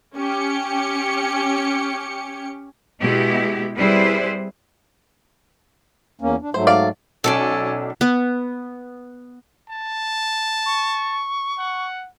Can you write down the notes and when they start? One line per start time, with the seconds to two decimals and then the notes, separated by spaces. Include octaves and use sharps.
0.15 C#4 G4 C#7
3.02 B2 G#3 B3 E4 G4
3.77 G3 C4 E4 G#4 B4 C5
6.21 E2 A#3 C#4
6.42 D4
6.54 G#2 F#3 A3 C5
6.67 D5 F5
7.24 B1 C#4 A4 C#5 D5
8.01 B3
9.70 A5
10.66 C#6
11.58 F#5